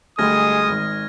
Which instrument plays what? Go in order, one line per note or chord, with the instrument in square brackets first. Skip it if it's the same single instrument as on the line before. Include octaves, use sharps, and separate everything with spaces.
[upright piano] D2 G3 [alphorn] G#3 [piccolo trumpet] D#6 [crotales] F6 G#6 A#6
[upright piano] G#1